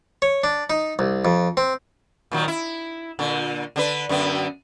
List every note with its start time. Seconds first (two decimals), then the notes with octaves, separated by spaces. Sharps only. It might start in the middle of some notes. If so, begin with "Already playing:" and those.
0.22 C#5
0.44 D4
0.70 D#4
0.99 C2
1.25 F2
1.57 C4
2.31 A#2 D#3 F#3
2.48 E4
3.19 A#2 D3
3.76 D3 D4 B4
4.09 F#2 D3 B3